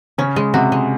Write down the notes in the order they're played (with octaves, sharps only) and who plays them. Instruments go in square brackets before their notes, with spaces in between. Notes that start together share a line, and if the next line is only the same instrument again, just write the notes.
[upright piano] C#3 [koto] C#4
[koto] G#3
[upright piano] C3 [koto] F#4
[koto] G#3